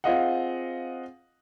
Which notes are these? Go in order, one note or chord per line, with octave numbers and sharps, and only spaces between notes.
C4 F4 G#4 D#5 F5 F#5